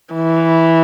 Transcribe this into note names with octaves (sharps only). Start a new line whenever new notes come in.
E3